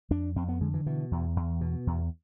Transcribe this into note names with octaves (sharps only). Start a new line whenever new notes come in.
F2 D4
F2 C4
B3
D3 G#3
E3
B2 E3
E2
E2
B2
E2